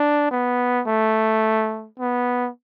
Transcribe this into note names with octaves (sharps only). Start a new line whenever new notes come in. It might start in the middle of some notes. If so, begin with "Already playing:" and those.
Already playing: D4
B3
A3
B3